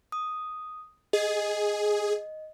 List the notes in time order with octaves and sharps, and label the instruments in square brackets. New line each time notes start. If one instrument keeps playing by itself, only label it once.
[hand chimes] D#6
[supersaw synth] G#4 [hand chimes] D#5